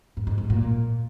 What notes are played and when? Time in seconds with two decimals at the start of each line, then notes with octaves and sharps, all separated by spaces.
0.17 G#2
0.27 G#2
0.38 G#2
0.50 A#2